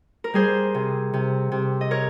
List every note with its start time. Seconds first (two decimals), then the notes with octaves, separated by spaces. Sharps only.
0.24 A#4
0.33 G3 G#4 C5
0.74 C3
1.13 C3
1.52 C3
1.81 D#5
1.91 A#4 C#5